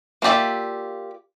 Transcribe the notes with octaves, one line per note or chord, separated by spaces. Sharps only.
A#3 F4 G4 D5 E5